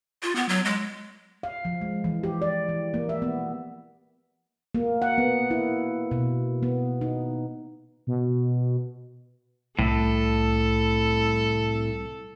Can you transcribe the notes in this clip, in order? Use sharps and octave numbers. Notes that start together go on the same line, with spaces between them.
F4
B3
F#3
G#3
F5
F3
G#3
E3
G4
D5
E3
A#3
E5
B3
A#3
F#5
B3
E4
B2
B3
D#4
B2
C2 A2 A4